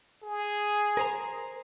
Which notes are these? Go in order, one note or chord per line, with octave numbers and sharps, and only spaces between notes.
G#4
A#4 C5 A#5